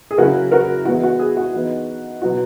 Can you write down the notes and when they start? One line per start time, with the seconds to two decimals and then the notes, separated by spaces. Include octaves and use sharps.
0.11 G#4
0.18 C#3 F#3 C#4 E4 F#4 A#4
0.51 F#4 A#4
0.85 E3 G#3 B3 E4 F#4
1.04 F#4
1.19 G#4
1.37 F#4
1.54 E3 B3 D#4
2.22 B2 F#3 B3 E4 F#4